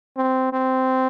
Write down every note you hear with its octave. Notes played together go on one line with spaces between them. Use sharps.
C4
C4